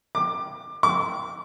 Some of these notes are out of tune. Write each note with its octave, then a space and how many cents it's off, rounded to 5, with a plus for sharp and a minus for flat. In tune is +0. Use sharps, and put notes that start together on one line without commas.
D6 +20
D6 -35